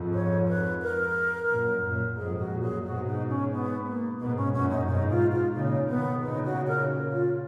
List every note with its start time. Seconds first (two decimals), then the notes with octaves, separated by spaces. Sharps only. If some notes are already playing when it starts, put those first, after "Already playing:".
Already playing: F2 G#2
0.14 C#5
0.48 B4
0.82 A#4
1.50 F#2 A#2
1.83 F#2 A#2
2.17 F2 G#2 G#4
2.39 F#4
2.51 F#2 A#2
2.62 G#4
2.85 G#2 B2 F#4
3.07 D#4
3.29 C#4
3.52 B3
3.86 A#3
4.20 G#2 B2 B3
4.37 C#4
4.53 F#2 A#2 C#4
4.70 D#4
4.87 G#2 B2 D#4
5.10 F4
5.32 F4
5.55 A#2 C#3 D#4
5.89 B2 D#3 B3
6.22 A#2 C#3 D#4
6.45 F#4
6.67 A#4
7.13 F4